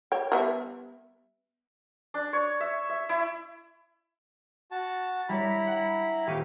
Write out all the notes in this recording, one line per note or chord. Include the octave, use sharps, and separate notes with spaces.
C#5 G5
G3 B3 E5
D4
C#5
E5
E5
E4
F#4 A5
G3 D4 E4 C#5 A#5 B5
F#5
D#1 G4 F5 C#6 D#7